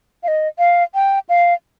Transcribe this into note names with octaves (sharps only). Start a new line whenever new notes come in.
F5
D#5
F5
G5
F5